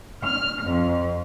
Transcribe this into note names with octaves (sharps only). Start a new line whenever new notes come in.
F6
F2